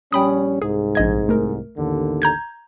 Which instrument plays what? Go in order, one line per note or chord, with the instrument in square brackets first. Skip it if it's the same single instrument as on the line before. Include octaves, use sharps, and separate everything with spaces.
[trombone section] A#1 G3 C#4 [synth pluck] G5 B5 D#6
[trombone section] C2 G#2 [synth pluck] G#4
[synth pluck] A#1 D#5 G#6
A3 A#4
[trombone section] A1 D#2 D3
[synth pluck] A#5 G6 G#6